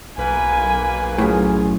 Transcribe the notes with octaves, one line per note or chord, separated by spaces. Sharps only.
B1 A#3 B4 G#5
F#2 A2 F4 G#4